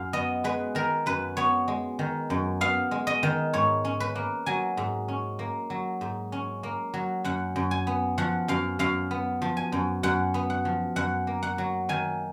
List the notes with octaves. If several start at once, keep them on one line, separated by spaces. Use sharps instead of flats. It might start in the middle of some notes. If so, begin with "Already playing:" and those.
Already playing: F#2 F5
B3 D#5
G#3 B4
D#3 A#4
F#2 B4
B3 C#5
G#3
D#3
F#2
B3 F5
G#3
D#5
D#3
G#2 C#5
C#4
B4
A#3
F#3 G#5
G#2
C#4
A#3
F#3
G#2
C#4
A#3
F#3
F#2 F#5
F#2
G#5
B3
F3 F#5
F#2 F5
F#2 F5
B3
F3
G#5
F#2
F#2 F#5
B3
F#5
F3
F#2 F#5
A#3
F#5
F#3
D#3 G#5